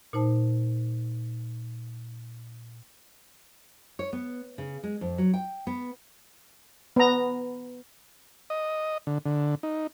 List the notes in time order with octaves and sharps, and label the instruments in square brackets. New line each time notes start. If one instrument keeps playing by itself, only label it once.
[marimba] A#2 D#4 C5 A5
[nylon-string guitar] C#5
B3
C#3
G#3
F2
F#3
G5
B3
[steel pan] B3 A#5
[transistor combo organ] D#5
D3
D3
D#4